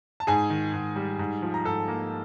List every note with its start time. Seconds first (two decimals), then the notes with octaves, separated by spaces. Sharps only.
0.20 A5
0.27 G#2 G#4 G#5
0.50 D#3
0.73 G#2
0.96 G3
1.19 G#2
1.42 F3
1.54 A#5
1.65 G#2 A4 A5
1.88 A#3